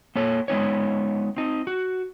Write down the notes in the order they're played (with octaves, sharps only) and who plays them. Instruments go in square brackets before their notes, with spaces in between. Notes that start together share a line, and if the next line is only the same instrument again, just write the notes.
[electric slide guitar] A#3 A4 C#5
G#3 B3 D#4 C#5
C4 D#4
F#4